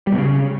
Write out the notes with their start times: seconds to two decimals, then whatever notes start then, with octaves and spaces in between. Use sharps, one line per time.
0.07 G3
0.12 B2
0.18 C#3